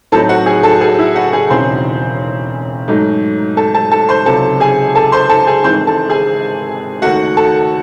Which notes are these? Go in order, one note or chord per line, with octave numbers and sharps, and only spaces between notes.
A2 F#3 C4 D#4 A4 A5
F#4 F#5
G#4 G#5
A4 A5
G#4 G#5
E4 E5
F#4 F#5
G#4 G#5
E1 D#2 C#3 E3 C4 C5 C6
G#2 F#3 A3 D#4
A4 A5
A4 A5
A4 A5
C5 C6
C#2 C3 F#3 A4 A5
G#4 G#5
A4 A5
C5 C6
A4 A5
G#4 G#5
G#1 G#2 E3 G#3 C4 C5 C6
A4 A5
G#4 G#5
D#2 D#3 A3 F#4 F#5
A4 A5